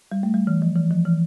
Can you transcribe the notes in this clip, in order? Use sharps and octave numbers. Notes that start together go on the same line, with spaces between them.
G3
A3
G3
E3
F3
E3
F3
E3